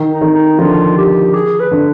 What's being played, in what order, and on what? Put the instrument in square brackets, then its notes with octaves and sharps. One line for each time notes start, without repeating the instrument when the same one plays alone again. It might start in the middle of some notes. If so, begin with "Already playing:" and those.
Already playing: [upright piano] D#3
[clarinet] D#4
[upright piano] D#3
[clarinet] D#4
[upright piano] D3 F3 [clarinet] F4
[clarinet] G4
G#4
B4
[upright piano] D3